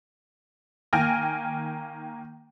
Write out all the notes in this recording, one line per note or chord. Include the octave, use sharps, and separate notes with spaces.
D#3 A#3 G5 G#5 F6 A#6